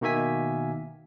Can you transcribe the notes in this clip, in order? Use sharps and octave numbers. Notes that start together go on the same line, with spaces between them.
B2 D#3 A#3 E5 G#5 B6